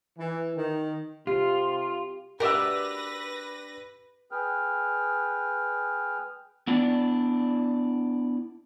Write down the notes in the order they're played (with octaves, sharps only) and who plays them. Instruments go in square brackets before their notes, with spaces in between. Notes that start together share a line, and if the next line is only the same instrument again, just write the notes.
[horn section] E3
D#3
[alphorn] C3 [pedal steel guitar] F4 [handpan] G4 [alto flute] C6
[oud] D4 F#4 A#4 [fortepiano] G4 D5 E5 [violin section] B4 A#6
[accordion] G#4 B4 G5 F6
[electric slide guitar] B3 D4 E4 D5